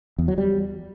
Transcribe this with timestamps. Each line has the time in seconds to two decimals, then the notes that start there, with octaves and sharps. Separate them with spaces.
0.19 E2
0.28 F#3
0.38 G3